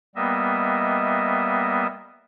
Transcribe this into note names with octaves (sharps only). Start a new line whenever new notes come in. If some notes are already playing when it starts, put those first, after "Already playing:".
G3 A#3 B3 D#5 E5